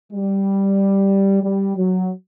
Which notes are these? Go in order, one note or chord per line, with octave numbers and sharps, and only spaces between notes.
G3
G3
F#3